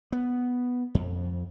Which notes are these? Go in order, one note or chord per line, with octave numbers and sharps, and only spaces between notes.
B3
F2